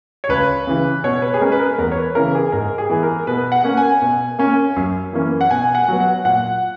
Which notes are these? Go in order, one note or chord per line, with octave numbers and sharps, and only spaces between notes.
C#5
C#2 B4
C#3 E3
B2 C#5
B4
G#4
G#3 C#4 A#4
B4
A#4
E2 A#4
C#5
B4
C#3 E3 A#4
G#4
G#2 A#4
G#4
E3 B3
A#4
B2 B4
F#5
A#3 C#4
G#5
B2
A#3 C#4
F#2
E3 A#3 C#4
F#5
B2 G#5
F#5
F#3 B3
F#5
A#2 F#5